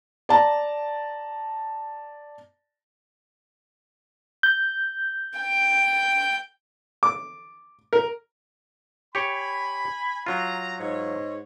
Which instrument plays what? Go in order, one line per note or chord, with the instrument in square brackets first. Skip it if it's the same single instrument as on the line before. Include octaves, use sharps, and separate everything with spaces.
[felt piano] D5 A5 A#5
[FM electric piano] G6
[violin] G5
[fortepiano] D6
A#4
[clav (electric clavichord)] G4 C#5 [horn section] G#5 B5
[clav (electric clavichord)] F#3 F4 [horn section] A#5
[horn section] G#2 C#5